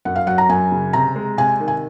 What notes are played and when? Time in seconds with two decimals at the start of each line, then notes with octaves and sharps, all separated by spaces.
0.05 F#2 F#5
0.16 F5
0.27 F#3 F#5
0.38 A#5
0.49 F#2 G#5
0.72 C#3
0.93 C3 A#5
1.16 G#3
1.37 C3 G#5
1.60 D#3
1.68 G#5